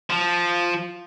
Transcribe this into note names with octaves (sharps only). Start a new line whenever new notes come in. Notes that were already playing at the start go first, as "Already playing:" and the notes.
F3